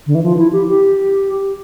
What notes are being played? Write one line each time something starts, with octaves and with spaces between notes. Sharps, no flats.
D3
E3
F3
E4
G4
G4